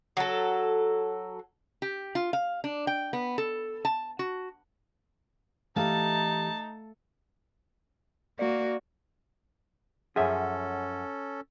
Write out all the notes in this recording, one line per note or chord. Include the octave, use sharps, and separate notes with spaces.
F#3 A4
G4
F4
F5
D4
G5
B3
A4
A5
F#4
E3 A3 D#4 G4 F5 A5
A#3 F#4 D5
F#2 F3 C#4 G#4 A4 E5 F#5